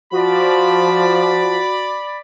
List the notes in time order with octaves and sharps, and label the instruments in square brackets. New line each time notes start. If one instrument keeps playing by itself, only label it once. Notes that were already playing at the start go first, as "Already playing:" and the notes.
[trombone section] F3 [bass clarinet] F#4 [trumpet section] D5 B5